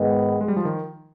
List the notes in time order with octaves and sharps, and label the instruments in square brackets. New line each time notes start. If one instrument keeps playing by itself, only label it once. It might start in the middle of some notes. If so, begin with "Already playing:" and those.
Already playing: [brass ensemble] G#2 D#3 G#3 B3
[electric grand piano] G#3
G3
F3
D#3